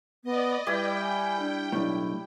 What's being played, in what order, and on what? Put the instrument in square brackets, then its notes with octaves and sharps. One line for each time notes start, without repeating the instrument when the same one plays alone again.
[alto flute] B3 [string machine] D5 D#5
[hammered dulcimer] G3 E4 D6 [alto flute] B4 [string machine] G5
[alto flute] G#5
D4
[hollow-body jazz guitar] B1 F#2 A2 [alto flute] D4